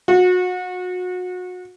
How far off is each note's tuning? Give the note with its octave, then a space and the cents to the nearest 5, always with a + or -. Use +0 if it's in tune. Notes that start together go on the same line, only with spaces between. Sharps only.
F#4 -30